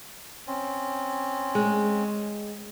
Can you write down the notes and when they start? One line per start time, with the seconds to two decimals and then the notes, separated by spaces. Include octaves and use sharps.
0.47 C4 C#4
1.55 G#3